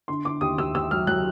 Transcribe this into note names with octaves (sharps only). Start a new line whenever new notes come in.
D3 C6
D3 D6
D#2 D#6
D#2 E6
D#2 E6
F#3 F6
F#3 F#6